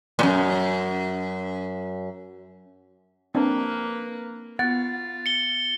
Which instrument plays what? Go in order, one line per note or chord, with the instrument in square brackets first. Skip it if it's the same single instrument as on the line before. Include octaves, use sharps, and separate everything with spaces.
[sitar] F#2 A#2
[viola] A#3 B4 [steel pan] C4 D4
[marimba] B3 [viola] F4 [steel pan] F#5 [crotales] A6
[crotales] C#7 G7